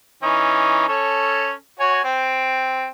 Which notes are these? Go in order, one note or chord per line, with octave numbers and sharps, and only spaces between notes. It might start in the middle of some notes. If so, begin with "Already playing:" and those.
E3 C#4 D#4
C#4 A4 C#5
F#4 C#5 G#5
C4 G5